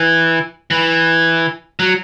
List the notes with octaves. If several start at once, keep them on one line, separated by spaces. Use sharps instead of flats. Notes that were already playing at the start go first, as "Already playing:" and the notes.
Already playing: E3
E3
F#3